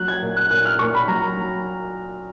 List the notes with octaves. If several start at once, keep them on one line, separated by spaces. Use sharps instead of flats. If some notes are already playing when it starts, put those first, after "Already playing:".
Already playing: F#3 F#6
G#6
A#2
F#6
A#2 F#6
F6
A#2 C#6
B5
F#3 A#5
F#3